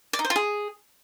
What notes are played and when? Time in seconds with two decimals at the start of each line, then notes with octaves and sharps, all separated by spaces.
0.13 D5
0.19 D#4
0.25 C5
0.30 F4
0.36 G#4